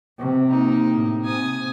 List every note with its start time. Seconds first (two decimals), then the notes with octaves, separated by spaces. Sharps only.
0.19 C3
0.50 A#3 D#4
0.93 A2
1.24 C3 G#5 D#6